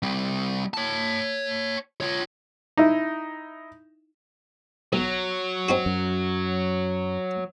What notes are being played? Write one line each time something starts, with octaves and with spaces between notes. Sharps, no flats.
G3 C4
C#5 A5
F4 C#5
D#4 E4
B1 F#3
C4 D#4 F#4
F#2